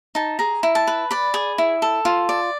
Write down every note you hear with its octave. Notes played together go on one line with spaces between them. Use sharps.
D#4 A5
G#4 A#5
E4
A5
B4
D5 B5
G#4
E4
A4
F4
D5